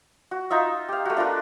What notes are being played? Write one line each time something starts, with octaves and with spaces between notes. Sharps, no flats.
F#4
D#4 F4 E5
G4 F5
A3 F#4
D4 F4 A#4 B4